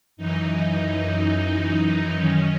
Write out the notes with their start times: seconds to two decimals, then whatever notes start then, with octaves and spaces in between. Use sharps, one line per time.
0.17 F#2 E3 D#4
2.14 F#2 D#3 C#4